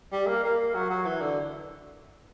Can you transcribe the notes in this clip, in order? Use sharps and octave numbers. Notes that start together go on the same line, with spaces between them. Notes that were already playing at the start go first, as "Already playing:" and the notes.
G3
A#3
A#3
F#3
F#3
E3
D3